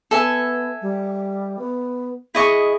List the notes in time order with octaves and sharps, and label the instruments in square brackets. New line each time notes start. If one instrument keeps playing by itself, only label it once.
[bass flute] B3 [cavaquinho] A4 E5 G#5
[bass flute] G3
B3
[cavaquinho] E4 D#5 C#6 [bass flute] G#4